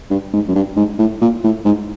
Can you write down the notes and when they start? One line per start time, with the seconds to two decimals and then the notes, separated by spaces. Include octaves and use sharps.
0.10 G2
0.33 G#2
0.48 F#2
0.55 G2
0.76 G#2
0.99 A2
1.21 A#2
1.43 A2
1.65 G#2